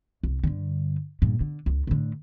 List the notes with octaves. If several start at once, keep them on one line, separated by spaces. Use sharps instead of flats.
C2
G2 D3
G2 A#2
D3
C#2
A2 D3